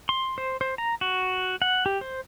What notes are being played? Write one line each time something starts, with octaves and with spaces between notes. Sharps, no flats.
C6
C5
C5
A#5
F#4
F#5
G4
C5